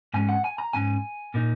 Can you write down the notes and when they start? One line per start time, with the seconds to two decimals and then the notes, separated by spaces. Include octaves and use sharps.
0.14 G#2 G#3 C#4 G#5
0.29 F#5
0.44 G#5
0.58 A#5
0.73 G#2 G#3 C#4 G#5
1.34 A#2 A#3 D#4